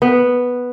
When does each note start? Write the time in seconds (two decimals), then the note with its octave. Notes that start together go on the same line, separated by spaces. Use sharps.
0.02 B3